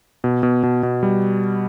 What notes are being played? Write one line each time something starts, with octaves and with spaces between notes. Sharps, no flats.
B2
B2
B2
B2
G3